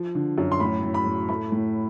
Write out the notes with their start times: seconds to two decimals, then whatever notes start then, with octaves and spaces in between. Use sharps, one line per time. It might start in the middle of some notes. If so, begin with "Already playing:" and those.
Already playing: F3
0.15 D3
0.38 F#2
0.52 C6
0.60 A2 B5
0.83 A2
0.94 B5
1.06 A2
1.29 A3 B5
1.52 A2